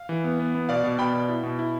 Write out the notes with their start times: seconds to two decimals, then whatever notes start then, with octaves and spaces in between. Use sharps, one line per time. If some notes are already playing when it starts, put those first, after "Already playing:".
Already playing: F5
0.09 E3
0.24 B3
0.39 B3
0.55 B3
0.69 B2 D5 F5
0.83 B2
0.99 B2 G5 B5
1.14 B2
1.29 E4
1.43 B2
1.59 E4